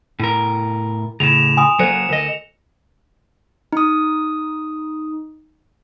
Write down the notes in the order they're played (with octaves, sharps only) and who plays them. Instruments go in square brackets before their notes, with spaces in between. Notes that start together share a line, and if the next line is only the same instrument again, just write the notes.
[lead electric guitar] A2 A#4
[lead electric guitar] A2 C#3 [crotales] E7 F7
[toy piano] G#5 C6 D#6
[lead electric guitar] F#3 A#3 [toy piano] A4 C5 [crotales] C#7
[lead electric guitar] D2 D#5 [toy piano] A#4 C5
[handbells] D#4 D#6